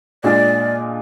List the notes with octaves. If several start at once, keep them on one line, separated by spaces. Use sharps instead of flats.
A#2 G#3 D4 F4 D5